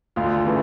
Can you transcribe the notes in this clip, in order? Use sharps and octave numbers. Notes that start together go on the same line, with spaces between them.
D2 F4
C#3 E3 A3